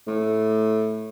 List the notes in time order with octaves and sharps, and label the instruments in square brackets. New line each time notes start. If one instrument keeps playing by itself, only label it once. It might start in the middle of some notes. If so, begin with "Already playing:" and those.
[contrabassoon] A2